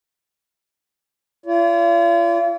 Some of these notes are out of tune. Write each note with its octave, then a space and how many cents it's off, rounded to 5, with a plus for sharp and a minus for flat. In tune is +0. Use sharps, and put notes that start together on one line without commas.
F4 -40 D5 -45